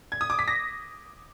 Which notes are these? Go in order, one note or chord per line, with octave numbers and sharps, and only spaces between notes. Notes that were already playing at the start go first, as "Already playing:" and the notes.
G#6
D#6
D6
B6
A#6